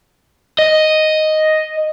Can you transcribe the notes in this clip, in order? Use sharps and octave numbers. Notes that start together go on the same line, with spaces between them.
D#5